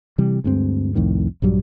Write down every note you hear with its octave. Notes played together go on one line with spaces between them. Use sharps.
C3 E3 G3
D2 G2 G#3 C4
C2 F2 A2 D#3
A#1 G2 F#3 G3